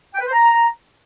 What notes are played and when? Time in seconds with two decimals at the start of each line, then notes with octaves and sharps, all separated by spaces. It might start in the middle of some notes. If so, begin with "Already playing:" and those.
0.15 G5
0.21 B4
0.27 C5
0.33 A#5